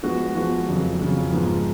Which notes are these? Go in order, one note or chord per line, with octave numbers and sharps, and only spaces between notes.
F3 G#3 B3 F#4
F3 G#3 B3 F#4
F2 C#3 F#3
F2 C#3 F#3
G#2 F3 B3